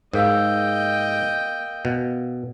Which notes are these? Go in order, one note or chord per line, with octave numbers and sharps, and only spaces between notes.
G#2 A#4 D#5 F5 G5 E6
B2